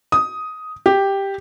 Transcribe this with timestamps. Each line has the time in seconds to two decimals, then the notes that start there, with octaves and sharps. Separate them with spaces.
0.12 D#6
0.86 G4